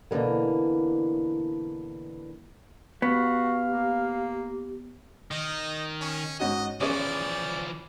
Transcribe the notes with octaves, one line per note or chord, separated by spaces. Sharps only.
B2 D3 E3 G#3 A#3
B3 F#4 G4 F5
A#3
D#3 D#5
C#4
G#2 C#4 F#4 D#5
E3 F3 C#4 G#4 C#5 D5